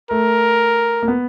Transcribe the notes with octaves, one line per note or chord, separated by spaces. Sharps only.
A3 A#4
A#3
B3